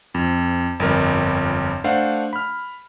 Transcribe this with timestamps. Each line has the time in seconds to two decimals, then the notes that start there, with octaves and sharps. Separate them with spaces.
0.14 F2
0.80 G1 F2 A#4
1.84 A3 D4 C5 F5 F#5
2.33 B5 F6